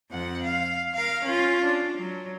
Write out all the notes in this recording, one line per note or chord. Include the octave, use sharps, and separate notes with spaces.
F2 F#5
F5
A#4 F5
C#4 F4
D4
F#3